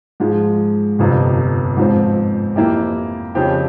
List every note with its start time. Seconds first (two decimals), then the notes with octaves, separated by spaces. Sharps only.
0.20 G#2 F3 G#3
0.99 G1 F2 C3
1.77 G#2 F3 C4
2.56 F2 E3 A#3 E4 G4
3.35 F2 C#3 F3 C4 G4